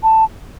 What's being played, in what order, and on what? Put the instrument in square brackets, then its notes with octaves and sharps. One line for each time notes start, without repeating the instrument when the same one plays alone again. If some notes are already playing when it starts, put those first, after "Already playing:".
[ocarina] A5